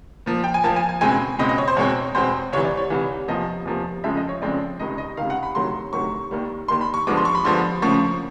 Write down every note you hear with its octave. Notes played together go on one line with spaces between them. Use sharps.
A#2 F3 A#3
G5
G#5
A#2 F3 A#3 A5
G#5
G#5
C#2 B2 G#3 C4 G#5
C#2 B2 G#3 C4 D#5
D#5
C#5
C5
E2 B2 G#3 C4 C#5
E2 B2 G#3 C4 C5
C2 C3 E3 C#5
D5
C#5
C2 C3 E3
E2 C3 F3 A#3 D#5
E2 C3 F3 A#3
F2 C#3 F3 G#3 C4 E5
D#5
C#5
F2 C#3 F3 G#3 C4 D5
C#2 C3 D#3 D#5
D#5
C#2 C3 D#3 F5
F#5
B5
D2 C3 D#3 F#3 C6
D2 C3 D#3 F#3 C#6
D#2 D#3 G3
D#2 D#3 G3 C6
B5
C#6
G2 D3 F3 G#3 B3 D6
C6
C#6
B5
G2 D3 F3 G#3 B3 C6
D2 C#3 F3 A#3 C#6